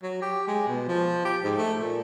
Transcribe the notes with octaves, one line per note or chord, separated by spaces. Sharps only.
F#3
G4
G#3
B2
F3
G4
G#2
A3
A#2